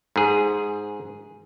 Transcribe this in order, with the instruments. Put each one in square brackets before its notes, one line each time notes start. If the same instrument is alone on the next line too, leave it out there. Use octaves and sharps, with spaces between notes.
[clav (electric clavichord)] G#2 G#4